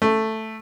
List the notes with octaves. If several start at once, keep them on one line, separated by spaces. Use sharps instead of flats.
A3